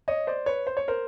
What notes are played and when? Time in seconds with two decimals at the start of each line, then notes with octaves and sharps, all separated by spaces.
0.08 C#5 D#5
0.27 C5 D5
0.46 B4 C#5
0.67 C5
0.77 C#5
0.88 A#4 C5